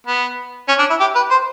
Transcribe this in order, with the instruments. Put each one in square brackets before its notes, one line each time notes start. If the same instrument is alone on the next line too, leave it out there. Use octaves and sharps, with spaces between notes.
[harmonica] B3
C#4
D4
E4
G4
B4
C5